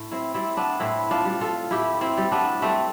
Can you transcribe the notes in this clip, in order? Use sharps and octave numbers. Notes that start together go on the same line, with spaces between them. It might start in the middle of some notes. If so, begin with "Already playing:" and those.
Already playing: A2
C4 E4
G3 C4 E4
B3 D4
A2 C4 E4
D4 F4
G3
F4 A4
A2 E4 G4
C4 E4
G3
B3 D4
G3 A3 C4